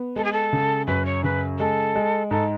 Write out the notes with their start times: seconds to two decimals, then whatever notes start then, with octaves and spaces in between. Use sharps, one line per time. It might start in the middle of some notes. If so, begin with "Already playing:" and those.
Already playing: B3
0.16 G#3 A4
0.24 G#4
0.33 A4
0.53 C#3
0.87 F#2 B4
1.06 C#5
1.24 C#3 B4
1.59 G#3 A4
1.95 G#3
2.30 G#2 A4